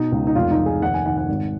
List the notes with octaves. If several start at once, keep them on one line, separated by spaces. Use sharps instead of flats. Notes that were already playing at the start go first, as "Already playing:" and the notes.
Already playing: B2 D#4
C#2
D#4
F1 F4
D#4
F1
G#4
D#2 F#5
G#5
D#3 F#5
F#5
G#1